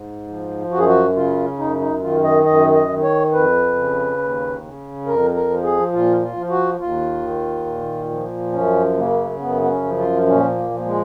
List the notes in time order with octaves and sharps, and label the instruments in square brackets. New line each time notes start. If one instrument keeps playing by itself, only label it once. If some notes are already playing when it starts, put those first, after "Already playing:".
Already playing: [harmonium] G#2
F3
F#2 F#4
G#4
F#4
C#3 F4
F#2 D#4
D#4
D#3 F4
D#5
F#2 D#5
D#5
D#3
C#5
F2 B4
C#3
D#2
C#3
F2 A#4
A#4
F3
G#4
A#2 F4
F4
F3
F#4
D#2 F4
D#3
A#2
F3
F#2 C#4
C#3 A#3
F#2 B3
B3
C#4
F3
F4
A#2 C#4
A#3
F3
G#3